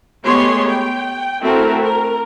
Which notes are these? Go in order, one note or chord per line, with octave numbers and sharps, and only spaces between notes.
G#3 A3 B3 G4 C#5 C6
G5
A3 C4 E4 F#4 A4 A#4
A#4